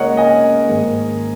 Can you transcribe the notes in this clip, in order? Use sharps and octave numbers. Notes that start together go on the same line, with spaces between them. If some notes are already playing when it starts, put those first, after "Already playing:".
Already playing: C#2 C#3 A#3 C#4 A#4 C#5 D#5 F#5
D#5 G#5
G#2 D#3 A#3